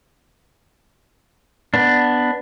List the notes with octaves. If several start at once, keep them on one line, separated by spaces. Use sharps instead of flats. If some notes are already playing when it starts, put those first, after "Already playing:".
B3 D4